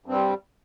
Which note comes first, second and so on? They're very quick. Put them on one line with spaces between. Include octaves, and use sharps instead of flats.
G2 C4 G3